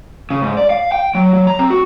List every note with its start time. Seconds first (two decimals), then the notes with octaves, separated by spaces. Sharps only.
0.30 C#3
0.42 G#2
0.57 D5
0.70 F5
0.92 G5
1.15 F#3
1.34 F#3
1.47 A#5
1.59 C4
1.70 F#4